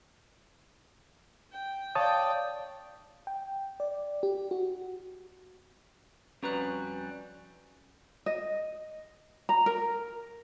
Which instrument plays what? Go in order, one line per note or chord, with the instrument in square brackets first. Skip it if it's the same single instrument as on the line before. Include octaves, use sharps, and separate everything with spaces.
[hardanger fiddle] G5
[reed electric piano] C#5 A5 D#6 [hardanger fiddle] D5 G5 [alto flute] F5
[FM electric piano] G5
D5
G4
F#4
[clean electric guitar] F2 G3 A#5 [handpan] C#4 [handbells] F#4 B4 F#6
[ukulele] D#5
A#5
A#4